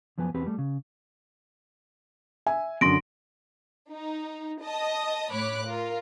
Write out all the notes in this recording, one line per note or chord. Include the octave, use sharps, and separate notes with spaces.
F#2 F3 B3 B4 G#5
E2 C4 G4 B4
G3 A3
C#3
E5 G#5
F#2 D3 C6 A#6 D7
D#4
D#5 A5 D#6
A2 C#5 B5 D6 F#6
F4 A#4